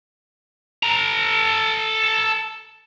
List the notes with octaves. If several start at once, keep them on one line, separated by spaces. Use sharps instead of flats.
A4 A#5